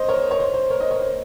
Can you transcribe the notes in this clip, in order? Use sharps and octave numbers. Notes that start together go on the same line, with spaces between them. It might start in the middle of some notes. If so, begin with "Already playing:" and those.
Already playing: C5 D#5
A#4 C#5
C#5
C5
C5
A#4 C#5
C5 D#5
A#4 C#5
C5